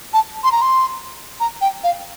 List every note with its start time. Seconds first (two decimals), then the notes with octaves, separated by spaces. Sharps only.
0.13 A5
0.44 C6
0.52 A#5
0.62 C6
1.40 A#5
1.61 G5
1.84 F5